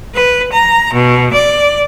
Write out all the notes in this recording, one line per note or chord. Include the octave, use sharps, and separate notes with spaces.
B4
A#5
B2
D5